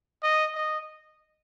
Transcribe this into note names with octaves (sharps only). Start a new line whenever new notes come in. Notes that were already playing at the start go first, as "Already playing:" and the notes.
D#5
D#5